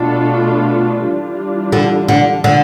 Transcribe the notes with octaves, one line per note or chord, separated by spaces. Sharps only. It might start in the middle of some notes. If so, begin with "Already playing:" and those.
Already playing: B2 A3 D4 F4 A4
E3 G3 D4 F4
D3
D3
D3